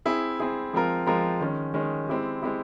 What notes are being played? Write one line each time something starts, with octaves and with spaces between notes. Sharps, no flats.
C4 E4 G#4
C4 E4 G#4
F3 G#3 C4 F4 A#4
F3 G#3 C4 F4 A#4
D#3 G#3 C#4
D#3 G#3 C#4
G#3 C4 E4 G4
G#3 C4 E4 G4